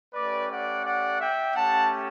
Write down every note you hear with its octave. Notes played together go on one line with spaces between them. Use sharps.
A3 C#4 G4 B4 D5
D5 F#5
D5 F#5
E5 G5
A3 C#4 G4 F#5 A5